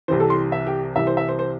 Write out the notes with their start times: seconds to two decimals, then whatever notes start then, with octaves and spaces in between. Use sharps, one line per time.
0.08 C2 C3 E3 C5
0.20 A4
0.30 C6
0.52 E5
0.67 G4
0.96 C2 C3 E3 E5
1.07 C5
1.17 E5
1.29 C5
1.39 C5